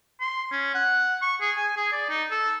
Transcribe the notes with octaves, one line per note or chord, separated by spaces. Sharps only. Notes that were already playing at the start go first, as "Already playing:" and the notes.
C6
C#4
F#5
C#6
G#4
G#5
G#4
D5
D#4
A4